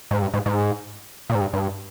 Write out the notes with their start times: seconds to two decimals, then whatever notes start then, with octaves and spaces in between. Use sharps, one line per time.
0.11 G#2
0.22 G2
0.34 G#2
0.46 G#2
1.30 A#2
1.35 G#2
1.41 G2
1.53 G2